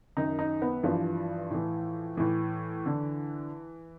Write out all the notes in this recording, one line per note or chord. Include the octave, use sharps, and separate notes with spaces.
F#2 D#3 D#4
D#4
B3
G2 E3 F3
A2 E3
A2 E3
D3